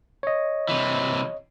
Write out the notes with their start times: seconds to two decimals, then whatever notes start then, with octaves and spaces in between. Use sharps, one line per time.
0.23 C#5 D#5
0.69 C3 E3